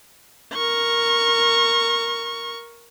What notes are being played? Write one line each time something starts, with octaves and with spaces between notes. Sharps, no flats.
A#4 C#6